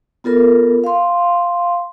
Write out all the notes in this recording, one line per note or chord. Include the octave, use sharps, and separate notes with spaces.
B3 F4 A4 A#4
F5 C6